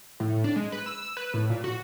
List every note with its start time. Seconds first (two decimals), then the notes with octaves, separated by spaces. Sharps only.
0.20 A2
0.44 D4
0.56 G#3
0.72 B4
0.86 E6
1.17 B4
1.34 A2
1.50 A#2
1.64 F#4